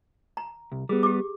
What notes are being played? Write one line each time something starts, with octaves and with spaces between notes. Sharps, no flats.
A#5
C2
G3 B3 G#4
G4 D6